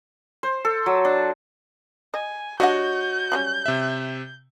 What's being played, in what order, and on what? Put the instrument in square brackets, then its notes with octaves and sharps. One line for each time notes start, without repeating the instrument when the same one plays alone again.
[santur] C5
A4
F#3
D4
[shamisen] D#5 [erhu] G#5
[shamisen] G3 D4 F#5 [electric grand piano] F#4 C#5 D#5 [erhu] G6
[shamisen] F#3 G3 C#4
[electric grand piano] C3 E5